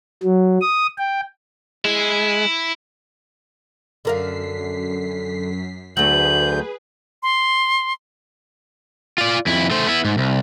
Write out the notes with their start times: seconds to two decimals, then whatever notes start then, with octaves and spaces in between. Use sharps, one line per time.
0.23 F#3
0.61 D#6
0.98 G5
1.85 G#3 E4
4.05 F#2 D3 A#4 F5 B6 C7
5.97 D2 F#3 A3 G#4 B4 G6 F#7
7.23 C6
9.18 F4 D5
9.47 F2 E4
9.71 A3 C5
9.87 B3 E4
10.05 G#2
10.18 C2